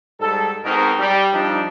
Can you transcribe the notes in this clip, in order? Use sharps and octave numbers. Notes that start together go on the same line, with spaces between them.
G#2 G3 A4
G#2 B2 C4 D#4 A#4
G3
F3 G3 D4 D#4